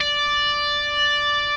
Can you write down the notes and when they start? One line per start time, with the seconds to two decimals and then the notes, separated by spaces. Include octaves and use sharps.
0.01 D5